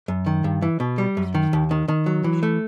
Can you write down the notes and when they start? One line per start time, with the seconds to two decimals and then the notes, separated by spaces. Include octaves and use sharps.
0.08 F#2
0.26 D#3
0.44 G2
0.62 E3
0.80 B2
0.98 G3
1.17 F#2
1.34 D#3
1.53 D#2
1.71 D#3
1.88 D#3
2.06 F#3
2.24 E3
2.43 A3